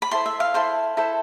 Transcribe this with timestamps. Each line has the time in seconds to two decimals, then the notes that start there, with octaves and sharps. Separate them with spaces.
0.02 B5
0.11 E4 A4 C5 C6
0.26 E5
0.40 F5
0.54 E4 A4 C5 C6
0.97 E4 A4 C5